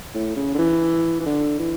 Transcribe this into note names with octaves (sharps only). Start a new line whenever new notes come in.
A2
C#3
D3
E3
E3
D3
E3